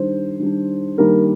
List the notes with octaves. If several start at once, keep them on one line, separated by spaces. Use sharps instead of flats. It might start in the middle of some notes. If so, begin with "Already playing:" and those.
Already playing: D#3 G3 D4 C5
D#3 G3 D4
D#3 G3 A#3 D4 A#4